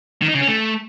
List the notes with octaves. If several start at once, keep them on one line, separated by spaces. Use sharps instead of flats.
D#3
D#4
C#3
C#4
A3